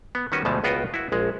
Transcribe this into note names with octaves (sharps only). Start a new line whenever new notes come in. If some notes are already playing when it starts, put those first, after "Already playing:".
B3
D#3 G3 C#4 F#4 B4
D2 B2 F3 G#3 A3 A5
C#2 B3 F4 F#4 B4 G5
E4 F#4
A#1 G#3